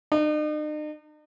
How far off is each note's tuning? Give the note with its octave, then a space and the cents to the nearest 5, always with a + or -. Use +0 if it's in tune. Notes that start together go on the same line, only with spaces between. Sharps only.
D#4 -45